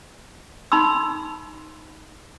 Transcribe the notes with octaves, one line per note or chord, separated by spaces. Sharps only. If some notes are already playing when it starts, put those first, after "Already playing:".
D#4 B5 C6 E6